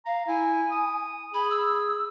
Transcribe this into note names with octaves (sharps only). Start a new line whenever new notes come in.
F5 A#5
E4 G#5
D#6
G#4 B5
E6